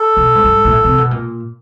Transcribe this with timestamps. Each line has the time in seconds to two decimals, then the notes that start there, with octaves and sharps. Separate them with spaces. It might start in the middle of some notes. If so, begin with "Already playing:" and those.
Already playing: A4
0.17 B2
0.35 G#2
0.44 G2
0.65 A#2
0.71 A2
0.84 C3
0.98 B2
1.11 A#2